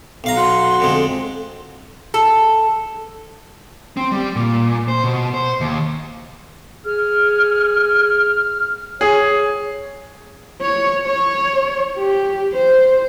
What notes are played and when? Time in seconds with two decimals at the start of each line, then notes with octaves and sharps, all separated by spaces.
0.24 B1 F5 A#5
0.37 F#4 C6
0.80 F2 D3 G#3
2.14 A4
3.97 C4
4.12 G3
4.36 A#2
4.88 C5
5.04 B2
5.34 C5
5.61 D#2
6.86 G#4 F6
9.01 G#4 C#5
10.62 C#5
11.07 C#5
11.98 G4
12.53 C5